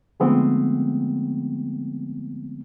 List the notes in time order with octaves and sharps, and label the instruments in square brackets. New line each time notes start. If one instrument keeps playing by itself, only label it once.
[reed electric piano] D3 F3 G#3 A3 B3 C4